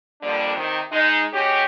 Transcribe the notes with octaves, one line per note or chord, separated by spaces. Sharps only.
F2 D3 F3 G3 A#3 D4
C3 D#3
G#3 D#4
G#3 C#4 F#4 G4